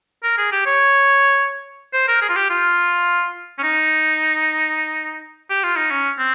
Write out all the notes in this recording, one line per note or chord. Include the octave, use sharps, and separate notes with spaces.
A#4
G#4
G4
C#5
C5
A#4
G#4
F4
G4
F4
C#4
D#4
G4
F4
D#4
C#4
C4